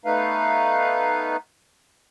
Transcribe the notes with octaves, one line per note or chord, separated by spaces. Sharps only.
A3 B3 D#4 B4 F5